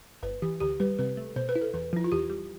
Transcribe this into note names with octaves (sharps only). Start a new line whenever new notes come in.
G1 B4
E3 G4
D2 G4
G3 B4
C3 B4
A3
B2 C5
B4
E4
A4
E2 B4
F3 E4
F4
E2 G4
G3